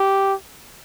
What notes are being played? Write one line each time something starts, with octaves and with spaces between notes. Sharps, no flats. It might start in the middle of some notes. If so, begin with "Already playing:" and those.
Already playing: G4